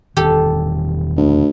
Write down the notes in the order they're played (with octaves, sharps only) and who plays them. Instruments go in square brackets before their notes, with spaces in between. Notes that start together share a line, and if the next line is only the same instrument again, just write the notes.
[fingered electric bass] E1 D#3 [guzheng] G4 A4
[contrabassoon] D2